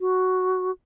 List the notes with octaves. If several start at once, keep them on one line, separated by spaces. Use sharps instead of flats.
F#4